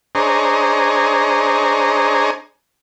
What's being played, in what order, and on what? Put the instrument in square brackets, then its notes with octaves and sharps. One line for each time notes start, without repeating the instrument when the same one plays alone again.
[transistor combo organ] D4 G#4 C5 C#5 D#5 A#5